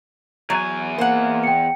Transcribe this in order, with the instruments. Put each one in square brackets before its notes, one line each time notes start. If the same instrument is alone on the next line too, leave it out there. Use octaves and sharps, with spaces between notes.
[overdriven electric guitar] E2 G#5 [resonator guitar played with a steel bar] F#3
[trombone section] A#3 [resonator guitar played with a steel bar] C5 F#5
[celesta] G5 C#7